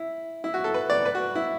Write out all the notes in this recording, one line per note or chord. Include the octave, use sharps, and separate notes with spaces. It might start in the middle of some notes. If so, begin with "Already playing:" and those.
Already playing: E4
E4
F#4
A4
B4
D5
B4
F#4
E4